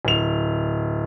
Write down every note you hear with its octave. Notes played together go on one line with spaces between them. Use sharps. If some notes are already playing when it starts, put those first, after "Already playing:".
D1 F7